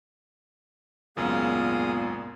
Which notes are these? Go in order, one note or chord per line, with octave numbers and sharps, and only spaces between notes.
G#1 C#2 F#2 A#2 B3 G#4 F5 D#6